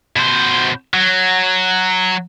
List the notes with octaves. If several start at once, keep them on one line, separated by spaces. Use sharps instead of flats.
B2 C5
F#3